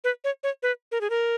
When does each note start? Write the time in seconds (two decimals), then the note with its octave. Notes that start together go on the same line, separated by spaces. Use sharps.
0.04 B4
0.24 C#5
0.43 C#5
0.63 B4
0.92 A#4
1.01 G#4
1.10 A#4